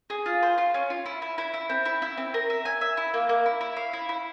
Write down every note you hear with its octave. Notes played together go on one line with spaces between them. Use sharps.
G#4
F4
C5
F4
C#4
F4
E4
E4
E4
E4
C4
E4
E4
C4
A#4
E5
G#5
E5
E4
A#3
A#3
E4
E4
F5
E4
E4